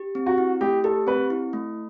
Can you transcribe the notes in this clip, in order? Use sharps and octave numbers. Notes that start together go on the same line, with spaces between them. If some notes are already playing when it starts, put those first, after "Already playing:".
Already playing: G4
C4
F#4
E4
A3 G4
G4 A4
C4 B4
E4
A3